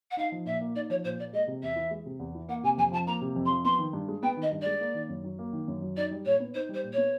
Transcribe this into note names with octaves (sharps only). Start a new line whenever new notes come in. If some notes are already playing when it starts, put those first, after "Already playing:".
F#5
D#4 F5
F3
A#2 E5
A#3
D#4 D5
F3 C#5
A#2 C5
A#3 D5
G#3 D#5
C3
E2 E5
E3
G#3
C3
E2
E3
A#3 F#5
C3 G#5
F2 G#5
F3 A5
A#3 A#5
C3
F2
C6
F3
B3 C6
D#3
G2
G#3
B3 G5
D#3 D#5
G2
G#3 D5
A#3
D#3
F#2
F#3
A#3
D#3
F#2
F#3
D#4 D5
G3
A#2 C#5
B3
D#4 C5
G3 C5
A#2
B3 C#5